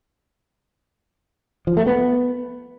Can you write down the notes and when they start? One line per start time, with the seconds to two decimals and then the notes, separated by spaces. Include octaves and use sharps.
1.67 F3
1.77 A3
1.86 B3